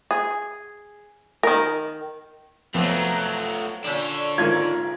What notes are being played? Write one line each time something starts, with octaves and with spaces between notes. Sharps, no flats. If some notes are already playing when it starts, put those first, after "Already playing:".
G#4
D#3 A#4
F2 F#3 A3 B3 C4 F4
A#2 D3 C#4 D4
G#1 G#2 F4 A#4 G#6